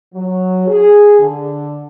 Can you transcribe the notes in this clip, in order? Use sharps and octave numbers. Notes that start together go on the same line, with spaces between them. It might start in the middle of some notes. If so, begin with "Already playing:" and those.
F#3
G#4
D3